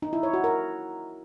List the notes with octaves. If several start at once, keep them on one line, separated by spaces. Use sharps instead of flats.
D#4
E4
C#5
F#4
A#4